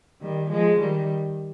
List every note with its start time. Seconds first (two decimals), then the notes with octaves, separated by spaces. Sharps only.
0.21 D#3 G3
0.50 F3 G#3
0.80 D#3 G3